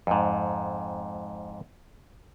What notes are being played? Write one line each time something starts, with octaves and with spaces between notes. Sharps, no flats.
F2 G#2